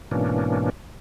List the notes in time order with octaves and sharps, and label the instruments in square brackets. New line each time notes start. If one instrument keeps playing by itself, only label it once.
[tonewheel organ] G#2 B2 E3 A#3 C#4 D4